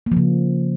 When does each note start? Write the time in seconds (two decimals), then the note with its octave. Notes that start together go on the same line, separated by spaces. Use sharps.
0.06 A#3
0.12 F3
0.17 C#3